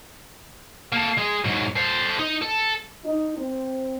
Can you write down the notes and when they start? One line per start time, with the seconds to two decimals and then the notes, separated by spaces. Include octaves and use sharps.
0.92 A#3 A4
1.18 G#3 G#4
1.45 G#2 F#3
1.76 A4 C5
2.19 D#4
2.42 A4
3.04 D#4
3.38 C4